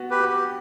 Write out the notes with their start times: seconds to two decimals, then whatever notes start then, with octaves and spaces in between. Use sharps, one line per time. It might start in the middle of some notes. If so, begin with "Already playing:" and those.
Already playing: B3 F#4
0.11 G4 B4
0.20 F#4
0.30 G4